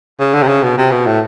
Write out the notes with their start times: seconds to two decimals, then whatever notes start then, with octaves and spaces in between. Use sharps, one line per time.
0.20 C#3
0.34 D3
0.43 C3
0.48 C#3
0.63 B2
0.78 C3
0.92 B2
1.07 A2